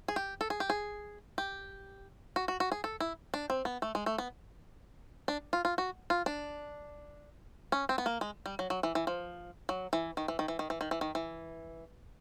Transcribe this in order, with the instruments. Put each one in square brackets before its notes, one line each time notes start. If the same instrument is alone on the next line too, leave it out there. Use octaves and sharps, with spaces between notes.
[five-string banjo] G#4
G4
A4
G#4
G4
G#4
G4
F#4
F#4
F#4
G#4
A4
E4
D4
C4
B3
A3
G#3
A3
B3
D4
F4
F4
F#4
F4
D4
C#4
C4
B3
A#3
G#3
G3
F#3
F#3
E3
E3
F3
F#3
E3
D#3
E3
D#3
E3
D#3
E3
D#3
E3
D#3
E3